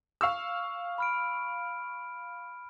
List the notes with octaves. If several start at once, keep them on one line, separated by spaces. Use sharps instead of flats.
F5 C#6 E6
B5 F6 D7